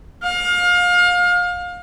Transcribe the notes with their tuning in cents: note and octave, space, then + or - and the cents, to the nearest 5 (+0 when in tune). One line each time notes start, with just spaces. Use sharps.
F5 +30